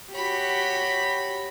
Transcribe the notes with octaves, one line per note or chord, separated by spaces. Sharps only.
F#4 G4 C#5 B5